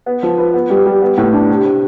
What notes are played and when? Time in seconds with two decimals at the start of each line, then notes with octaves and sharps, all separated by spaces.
0.06 B3
0.23 F3
0.38 B4
0.54 B3
0.70 G3
0.85 G3
1.02 B3
1.17 A2
1.33 D4
1.49 C3
1.65 C3